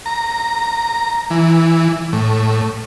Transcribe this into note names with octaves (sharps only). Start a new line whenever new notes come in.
A#5
E3
A2